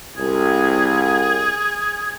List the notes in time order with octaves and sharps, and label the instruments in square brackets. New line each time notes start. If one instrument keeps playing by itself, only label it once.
[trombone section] C2 [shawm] G#4